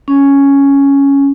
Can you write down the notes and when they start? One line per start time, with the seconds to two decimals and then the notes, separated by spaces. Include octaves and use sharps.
0.08 C#4